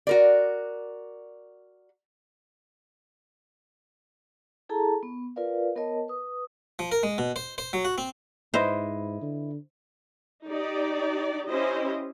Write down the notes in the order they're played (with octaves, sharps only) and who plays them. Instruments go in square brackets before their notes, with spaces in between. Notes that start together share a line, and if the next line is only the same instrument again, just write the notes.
[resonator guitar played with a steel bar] F#4 A#4 D5
[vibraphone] E4 G#4 A4 A5 A#5
B3
F4 A#4 B4 D5 F5
B3 A#4 C#5 D#5 A5
B4 D#6
[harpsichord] F3
A#4
G#3
B2
C5
C5
F#3
F#4
C4
[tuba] G#2 [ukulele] E4 B4 D#5 [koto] C5
[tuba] D3
[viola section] D#4 G4 D5
C#4 E4 G4 C5 D#5